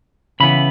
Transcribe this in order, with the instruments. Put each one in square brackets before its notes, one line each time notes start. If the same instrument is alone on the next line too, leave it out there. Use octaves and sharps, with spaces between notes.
[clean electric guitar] C#3 E3 B3 B5